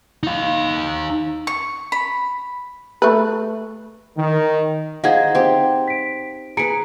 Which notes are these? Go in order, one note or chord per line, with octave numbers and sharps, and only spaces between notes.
D#4 F5
C#6
B5
A3 B4
D#3
D#4 G#4 C5 F5 F#5 G#6
C4 G4
B6 D7
G#4 B4 A#5 C#7 D7